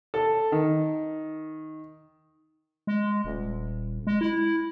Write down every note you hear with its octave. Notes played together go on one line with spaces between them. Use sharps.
A4
D#3
G#3
D#1
G#3
E4